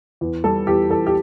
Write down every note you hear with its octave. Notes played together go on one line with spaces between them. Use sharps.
E2
G3 A4
E2 G4
E2 A4
G4